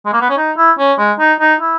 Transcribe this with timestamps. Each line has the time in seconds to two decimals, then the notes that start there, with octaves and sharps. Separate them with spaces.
0.05 G#3
0.13 A#3
0.21 B3
0.30 C#4
0.37 D#4
0.57 E4
0.79 C#4
0.98 G#3
1.19 D#4
1.40 D#4
1.60 E4